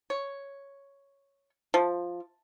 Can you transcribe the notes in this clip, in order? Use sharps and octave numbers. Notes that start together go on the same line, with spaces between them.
C#5
F3